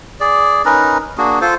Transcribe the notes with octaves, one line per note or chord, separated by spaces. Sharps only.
G#4 D5
C#4 D#4 A#4 B4
A#3 D4 F#4 G#4
F4 A4 C5